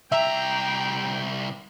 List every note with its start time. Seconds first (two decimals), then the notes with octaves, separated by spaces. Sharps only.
0.12 C2 E5 G5 A#5